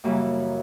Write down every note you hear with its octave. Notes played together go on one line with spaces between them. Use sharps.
F#2 C#3 E3 G3 A#3